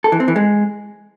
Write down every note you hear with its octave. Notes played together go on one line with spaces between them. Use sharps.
A4
E3
C4
E3
G#3